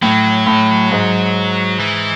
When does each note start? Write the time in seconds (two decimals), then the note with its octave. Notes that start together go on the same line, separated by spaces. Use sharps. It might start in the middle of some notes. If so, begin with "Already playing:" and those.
0.02 A2 F#3
0.47 A2
0.92 G#2
1.79 E3